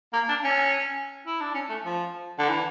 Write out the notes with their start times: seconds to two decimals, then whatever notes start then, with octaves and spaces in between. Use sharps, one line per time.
0.13 A#3
0.29 D4
0.44 C#4
1.27 E4
1.41 D4
1.54 C#4
1.70 A3
1.85 F3
2.39 D3
2.49 E3